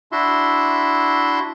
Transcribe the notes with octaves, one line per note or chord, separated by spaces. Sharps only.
D4 E4 F#4 E5 C6